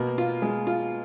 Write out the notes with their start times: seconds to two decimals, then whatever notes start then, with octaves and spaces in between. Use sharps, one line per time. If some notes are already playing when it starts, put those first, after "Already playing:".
Already playing: B2 A#3
0.18 F4
0.42 G#3
0.67 F4